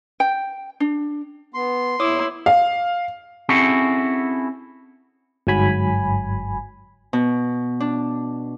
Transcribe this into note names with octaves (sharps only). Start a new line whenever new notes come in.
G5
D4
B3 C6
E2 E4 C#5 D6 D#6
F5
C4 C#4 E4 F#4 G#4 A4
G1 G#2 F#3 G#5 B5
B2
D4